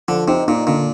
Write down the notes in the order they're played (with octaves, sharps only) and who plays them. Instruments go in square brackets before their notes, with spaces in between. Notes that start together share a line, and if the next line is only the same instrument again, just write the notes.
[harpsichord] D3 [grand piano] F3
[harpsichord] C3 [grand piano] D#4
[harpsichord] A#2 [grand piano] D#4
[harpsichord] A#2 [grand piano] D3